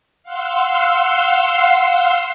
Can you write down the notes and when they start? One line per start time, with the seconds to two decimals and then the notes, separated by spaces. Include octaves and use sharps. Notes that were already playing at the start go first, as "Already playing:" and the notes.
0.23 F5 F#5 C6 E6